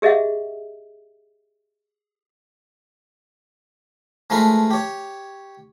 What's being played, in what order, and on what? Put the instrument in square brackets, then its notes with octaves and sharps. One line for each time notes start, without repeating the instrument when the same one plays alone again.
[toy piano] G4 G#4 D#5 E5 F#5
[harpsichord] F3 G#3 A3 D#4 A#4 B4
G4 C#5